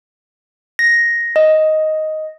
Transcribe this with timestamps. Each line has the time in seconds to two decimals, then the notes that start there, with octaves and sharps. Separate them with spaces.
0.79 A#6
1.36 D#5